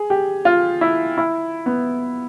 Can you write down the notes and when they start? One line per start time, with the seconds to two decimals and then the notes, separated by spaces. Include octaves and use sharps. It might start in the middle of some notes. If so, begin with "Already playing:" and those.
Already playing: G#4
0.10 G4
0.45 F4
0.81 E4
1.18 E4
1.66 B3